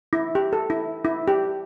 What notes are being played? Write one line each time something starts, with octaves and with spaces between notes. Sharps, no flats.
E4
G4
A4
E4
E4
G4